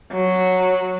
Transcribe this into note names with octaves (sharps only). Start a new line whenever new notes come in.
F#3